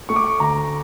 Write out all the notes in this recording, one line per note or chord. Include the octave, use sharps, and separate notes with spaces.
A3 C#6
D6
C#6
D2 A#5